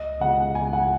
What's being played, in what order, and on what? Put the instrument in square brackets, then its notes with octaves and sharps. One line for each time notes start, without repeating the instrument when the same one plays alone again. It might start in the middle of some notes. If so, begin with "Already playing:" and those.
Already playing: [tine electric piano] C#2 [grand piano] D#5
[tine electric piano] C#3 G#3 B3 F4 [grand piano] F#5
[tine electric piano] C#2 [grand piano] G#5
[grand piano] F#5